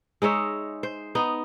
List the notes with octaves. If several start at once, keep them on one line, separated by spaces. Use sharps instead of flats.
G#3 D#4 C#5 E5
C5
B3 D#4